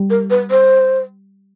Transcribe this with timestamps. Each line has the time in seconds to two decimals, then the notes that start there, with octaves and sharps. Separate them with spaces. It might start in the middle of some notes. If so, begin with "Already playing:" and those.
Already playing: G3
0.10 A#4
0.30 B4
0.51 C5